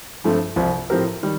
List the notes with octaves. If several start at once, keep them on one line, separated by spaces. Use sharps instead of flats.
G2 F3 A3 C4
C2 C3 F3
A2 F3 C4 G4 A#4
D#3 G3